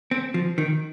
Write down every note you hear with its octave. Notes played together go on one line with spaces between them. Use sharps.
C4
F3
D#3